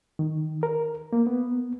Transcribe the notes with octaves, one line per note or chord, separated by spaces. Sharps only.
D#3
A#4
A#3
B3